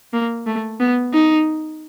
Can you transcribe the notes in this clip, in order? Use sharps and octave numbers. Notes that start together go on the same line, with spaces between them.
A#3
A3
B3
D#4